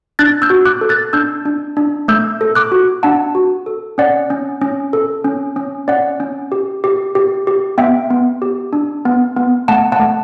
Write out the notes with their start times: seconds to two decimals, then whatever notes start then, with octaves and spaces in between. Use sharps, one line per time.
0.19 D4 F#6 A6
0.42 E6 G6
0.50 F#4
0.66 D6 F#6
0.81 A4
0.89 F#6 A6
1.13 D4 E6 G6
1.45 D4
1.77 D4
2.08 A3 E6 G6
2.41 A4
2.55 D6 F#6
2.72 F#4
3.03 D4 F#5 A5
3.35 F#4
3.66 A4
3.98 C#4 D5 F#5
4.30 C#4
4.61 C#4
4.93 A4
5.24 C#4
5.56 C#4
5.88 C#4 D5 F#5
6.20 C#4
6.52 G4
6.84 G4
7.15 G4
7.47 G4
7.78 B3 E5 G5
8.10 B3
8.42 G4
8.73 D4
9.05 B3
9.37 B3
9.68 A3 F#5 A5
9.92 F#5 A5
9.99 A3